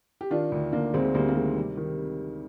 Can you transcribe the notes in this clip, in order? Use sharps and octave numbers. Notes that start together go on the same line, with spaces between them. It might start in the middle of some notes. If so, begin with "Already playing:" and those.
G4
D#3 D4 F4
D2
D2 A#3 D4
D2 G#3 C4
G#3
D2 G3 A#3
A#3
D#3 G#3
C3 G3
D#3